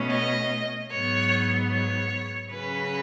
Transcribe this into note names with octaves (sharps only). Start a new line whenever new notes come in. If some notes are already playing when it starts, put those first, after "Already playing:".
Already playing: B2 A3 C#4
D#5
G#2 F#3 B3 C#5
C#5
C#3 F#3 C#4 B4